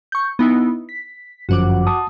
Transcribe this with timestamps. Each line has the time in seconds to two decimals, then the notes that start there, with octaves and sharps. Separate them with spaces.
0.12 C#6 G6
0.39 B3 D#4 E4
0.89 B6
1.49 G1 F#2 F3 F#4 F#5 D6
1.87 A5 D#6